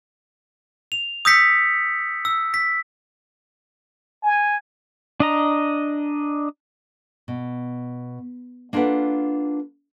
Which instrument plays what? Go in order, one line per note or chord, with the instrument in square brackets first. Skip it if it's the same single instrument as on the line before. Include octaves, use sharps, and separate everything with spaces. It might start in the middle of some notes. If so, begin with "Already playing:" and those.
[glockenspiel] F7
D#6 E6 G6 A#6 B6 C#7
E6
B6
[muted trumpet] G#5
[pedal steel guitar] D4 D#5 A#5
[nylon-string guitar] B2
A#3 D4 F4 A4 B4 F#5